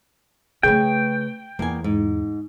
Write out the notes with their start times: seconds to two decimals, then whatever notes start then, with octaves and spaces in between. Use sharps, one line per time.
0.63 C#3 A3 G#4 B4 C#5 G5
1.59 E2 A#3 B3 G#5
1.84 G#2